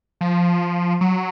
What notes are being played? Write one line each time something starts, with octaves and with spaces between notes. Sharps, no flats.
F3
F#3